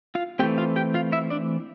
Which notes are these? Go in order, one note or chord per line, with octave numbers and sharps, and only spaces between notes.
F4 F5
E3 A3 C4 G4 G5
F4 F5
G4 G5
F4 F5
E4 E5
D4 D5